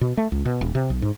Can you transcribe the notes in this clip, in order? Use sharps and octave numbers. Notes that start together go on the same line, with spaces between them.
B2
A3
C#2
B2
D#1
C3
B1
G#2